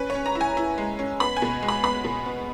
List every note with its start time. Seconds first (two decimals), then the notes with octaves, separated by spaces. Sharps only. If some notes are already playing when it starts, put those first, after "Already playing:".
Already playing: C#4 B4
0.10 C#5
0.15 C#4
0.26 A#5
0.35 E4
0.41 G#5
0.57 E4
0.78 G#3
0.99 C#4
1.20 B3 B5
1.36 G#5
1.42 B2
1.63 G#3
1.68 B5
1.83 B3 B5
2.04 B2
2.26 B3